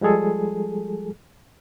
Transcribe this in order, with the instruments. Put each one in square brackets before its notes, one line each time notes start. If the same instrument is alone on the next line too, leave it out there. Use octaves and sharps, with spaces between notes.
[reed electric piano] F3 G3 G#3 G#4 A4